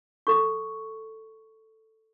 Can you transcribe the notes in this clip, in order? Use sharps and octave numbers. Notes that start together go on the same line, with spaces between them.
A4 C#6